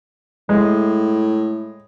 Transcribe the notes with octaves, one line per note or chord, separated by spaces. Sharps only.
A2 G#3